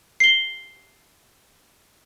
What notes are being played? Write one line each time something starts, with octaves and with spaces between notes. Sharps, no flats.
C7 G7